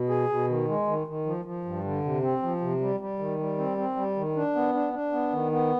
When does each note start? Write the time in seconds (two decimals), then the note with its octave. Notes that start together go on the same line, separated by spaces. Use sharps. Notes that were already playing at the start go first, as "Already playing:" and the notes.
Already playing: B2
0.09 G#4
0.29 B2
0.49 D#3
0.68 G#3
0.87 D#3
1.07 D#3
1.26 F3
1.45 F3
1.65 G2
1.84 D3
2.04 C3
2.22 C4
2.43 F3
2.61 C3
2.81 G3
3.00 G3
3.19 D#3
3.38 G3
3.58 C4
3.78 C4
3.96 G3
4.16 D#3
4.36 D4
4.55 B3
4.74 D4
4.93 D4
5.12 B3
5.32 D#3
5.52 B3